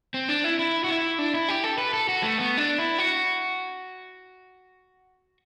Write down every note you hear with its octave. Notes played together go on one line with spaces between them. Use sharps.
C4
D4
E4
E4
F#4
E4
D4
E4
G4
A4
B4
A4
F#4
A3
B3
D4
E4
F#4